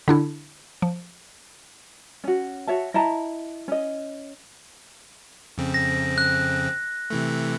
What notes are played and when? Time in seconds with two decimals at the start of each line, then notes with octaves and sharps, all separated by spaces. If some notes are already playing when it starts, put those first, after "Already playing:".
0.08 D3 D4 E4
0.82 F3
2.24 C#4 F#4
2.67 F#4 C#5 E5 A5
2.94 E4 D#5 A5 A#5
3.68 C#4 D#5
5.58 F2 C#3 C4
5.74 A#6
6.18 F#6
7.10 C3 E3 A3